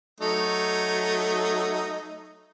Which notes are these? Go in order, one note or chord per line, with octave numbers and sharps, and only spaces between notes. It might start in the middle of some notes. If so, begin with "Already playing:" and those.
F#3 A3 D#4